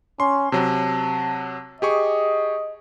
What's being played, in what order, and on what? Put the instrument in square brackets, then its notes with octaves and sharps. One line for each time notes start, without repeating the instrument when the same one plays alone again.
[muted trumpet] C#4 [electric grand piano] C6
[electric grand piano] C3 F#3 [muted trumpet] A5
[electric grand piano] G4 G#4 C#6 [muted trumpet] D#5